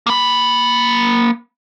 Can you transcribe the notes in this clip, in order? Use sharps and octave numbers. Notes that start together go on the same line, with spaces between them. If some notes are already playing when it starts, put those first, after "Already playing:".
A#3 B5